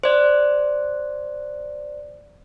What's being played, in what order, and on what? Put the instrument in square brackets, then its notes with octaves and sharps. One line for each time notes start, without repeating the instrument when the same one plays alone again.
[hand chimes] C5 D5